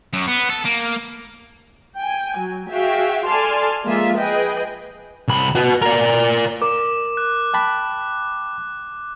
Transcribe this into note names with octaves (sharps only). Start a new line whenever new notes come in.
F#2
B3
A4
A#3
G5 G#5
F#3
F#4 G#4 E5 F5 G5
A4 D5 G#5 A5 C6 F6
F3 G#3 A#3 F4 G#4 E5
G#4 B4 D#5 G5
C2 B5
F#4 B4
A#4 D5
A#4 D6
F#6
G5 A5 B5